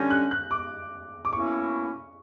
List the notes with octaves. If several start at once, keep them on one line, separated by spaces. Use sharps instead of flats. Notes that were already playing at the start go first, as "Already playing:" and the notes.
Already playing: D3 G3 C#4 G6 A#6
F#6
F#6
D6
D6
B2 A#3 C#4 E4 C#6